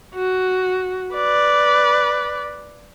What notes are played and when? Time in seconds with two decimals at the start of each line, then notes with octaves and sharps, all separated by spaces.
0.15 F#4
1.14 B4 D5